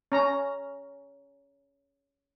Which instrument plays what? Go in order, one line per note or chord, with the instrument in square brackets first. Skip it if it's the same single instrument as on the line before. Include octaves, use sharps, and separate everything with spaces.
[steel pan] C#4 A#5